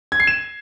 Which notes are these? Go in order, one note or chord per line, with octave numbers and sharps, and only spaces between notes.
G#6
C7
E7